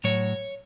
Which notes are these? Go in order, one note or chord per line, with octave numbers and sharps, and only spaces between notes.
A2 F#3 C#5